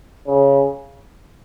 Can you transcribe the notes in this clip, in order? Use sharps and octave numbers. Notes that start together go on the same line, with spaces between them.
C#3